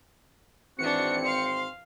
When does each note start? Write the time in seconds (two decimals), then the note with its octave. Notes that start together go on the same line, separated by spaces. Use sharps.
0.79 G#1 E3 C4 D4 F#4 C#7
1.26 F5 C6